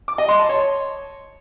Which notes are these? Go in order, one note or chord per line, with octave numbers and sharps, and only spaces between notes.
D6
D#5
C6
A5
C#5